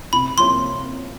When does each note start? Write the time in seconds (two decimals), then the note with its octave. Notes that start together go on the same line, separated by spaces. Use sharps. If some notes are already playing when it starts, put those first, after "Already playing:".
0.13 C3 B5
0.38 F3 A#3 C#4 E4 C6